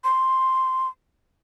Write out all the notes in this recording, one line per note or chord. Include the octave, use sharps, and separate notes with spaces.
C6